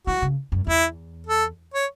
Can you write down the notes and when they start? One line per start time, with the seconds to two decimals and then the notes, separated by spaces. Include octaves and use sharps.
0.07 E3 F#4
0.22 C#3
0.52 F#2
0.67 E2 E4
1.27 A4
1.74 C#5